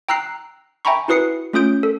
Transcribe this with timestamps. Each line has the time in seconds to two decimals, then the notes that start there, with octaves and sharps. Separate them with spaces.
0.09 G5 A#5 E6 F#6 C7
0.85 E5 G5 G#5 A#5 B5 C#6
1.08 E4 F#4 B4 D#6 C7 C#7
1.53 A3 C#4 F4 D#6 G6 D7
1.83 A4